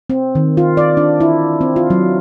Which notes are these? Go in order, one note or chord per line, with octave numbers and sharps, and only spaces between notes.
C4
D#3
F4
D5
D4
E4
C4
F4
F#3